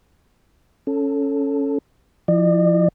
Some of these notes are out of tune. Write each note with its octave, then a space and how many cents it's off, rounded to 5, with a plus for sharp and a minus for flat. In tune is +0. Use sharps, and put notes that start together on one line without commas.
C#4 +0 A4 +0
F3 +0 E4 +0 D5 +45